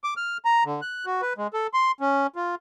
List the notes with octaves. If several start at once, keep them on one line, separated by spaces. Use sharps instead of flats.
D6
F6
A#5
D3
F#6
F#4
B4
G#3
A4
C6
C#4
F4